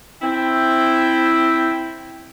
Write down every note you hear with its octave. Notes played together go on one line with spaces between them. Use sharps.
C4 E4 G5